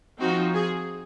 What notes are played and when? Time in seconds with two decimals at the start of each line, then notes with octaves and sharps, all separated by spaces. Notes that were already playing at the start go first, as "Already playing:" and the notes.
0.20 F3 C4 D#4 F#4
0.54 G#4